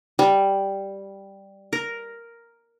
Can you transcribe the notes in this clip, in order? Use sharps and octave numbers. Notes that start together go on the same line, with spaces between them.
G3
A#4